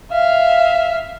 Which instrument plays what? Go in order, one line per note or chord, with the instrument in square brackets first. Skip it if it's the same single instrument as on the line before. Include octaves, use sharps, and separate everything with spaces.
[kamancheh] E5 F5